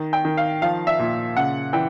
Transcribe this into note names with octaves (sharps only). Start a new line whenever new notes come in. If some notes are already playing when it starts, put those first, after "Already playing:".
Already playing: D#3
G5
D#3
F5
F3 F5
E5
A#2
C#3 F#5
E3 G5